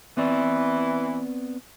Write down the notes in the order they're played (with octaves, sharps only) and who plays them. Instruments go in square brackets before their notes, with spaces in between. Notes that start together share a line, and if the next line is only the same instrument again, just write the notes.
[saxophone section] E3 [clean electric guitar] B3 C4 D5